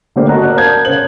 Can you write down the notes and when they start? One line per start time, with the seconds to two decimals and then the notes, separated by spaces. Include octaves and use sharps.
0.16 D3 A3 A#3 G4 C5 D5
0.28 F#4 D#5 F#5 A5 A#5 F#6
0.42 A#4 D5 F#6
0.56 A#4 C5 F5 A5 G6 G#6
0.85 C#3 C5 F#7